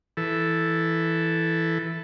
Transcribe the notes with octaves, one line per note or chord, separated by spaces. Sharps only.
E3 A4